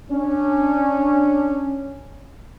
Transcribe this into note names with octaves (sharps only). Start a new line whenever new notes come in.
C#4 D4